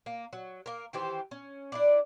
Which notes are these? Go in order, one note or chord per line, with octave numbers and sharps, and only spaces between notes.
A#3
F#3
A#3 A#4
D#3 E3 G4 C5
C#4
D4 E4 D5